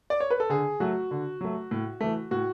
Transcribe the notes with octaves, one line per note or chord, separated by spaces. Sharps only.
D5
C#5
B4
A4
D3 G#4
F#3 A3 F#4
D3
F#3 A3
A2
E3 A3
A2 F#4